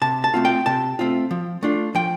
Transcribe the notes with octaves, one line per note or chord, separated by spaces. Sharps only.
C3 A5
A5
A3 C4 F4
G5
C3 A5
A3 C4 F4
F3
A3 D4 F4
F3 G5